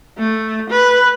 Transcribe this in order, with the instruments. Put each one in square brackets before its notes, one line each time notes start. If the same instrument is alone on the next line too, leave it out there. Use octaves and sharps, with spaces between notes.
[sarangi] A3
B4